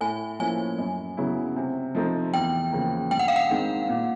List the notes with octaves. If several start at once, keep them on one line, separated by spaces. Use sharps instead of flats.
A2 G#5
F3 A#3 C#4 E4 G#5
F#2
C#3 F#3 B3 E4
C3
F3 A3 C4 D#4
E2 G5
C#3 F3 A#3
G2 G5
F#5
F5
F#5
D#3 G#3 C4
A#2